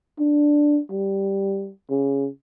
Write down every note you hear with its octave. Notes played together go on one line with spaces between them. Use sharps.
D4
G3
C#3